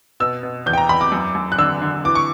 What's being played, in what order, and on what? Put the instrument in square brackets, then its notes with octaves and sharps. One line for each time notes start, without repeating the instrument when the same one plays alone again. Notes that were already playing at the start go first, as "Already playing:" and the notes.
[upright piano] B2 E6
B2
E2 G6
G5
A#5
E2 B5
D6
F#2
F#2
F#6
D3 E6
D3
E3 D6
C#6